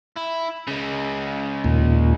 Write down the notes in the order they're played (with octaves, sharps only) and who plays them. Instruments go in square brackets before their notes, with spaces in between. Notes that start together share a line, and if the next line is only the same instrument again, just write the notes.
[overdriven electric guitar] E4
C#3 G#3
[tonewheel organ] D#2 A#2